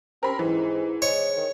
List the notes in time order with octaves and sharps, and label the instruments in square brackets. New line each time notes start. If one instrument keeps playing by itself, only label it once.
[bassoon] C4 [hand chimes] C#4 G4 C5 [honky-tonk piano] A#4 B5
[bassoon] G#2 [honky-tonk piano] E3 [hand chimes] E4
[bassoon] G#3 [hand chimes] C5 [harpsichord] C#5 [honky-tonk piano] C#7
[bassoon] D#3